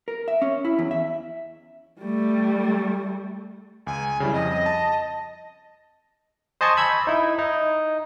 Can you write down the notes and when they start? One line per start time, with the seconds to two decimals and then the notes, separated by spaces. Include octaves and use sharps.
0.08 A#4
0.28 E5
0.42 C#4
0.65 E4
0.79 E2
0.91 E5
2.01 G3 A3
3.87 C#2 G#5
4.20 C#3 G3 E4
4.33 F2 D#5
4.66 A5
6.61 C5 D#5 G#5 A5 C#6
6.77 B5 E6 G#6
7.07 D#4 E4
7.38 D#4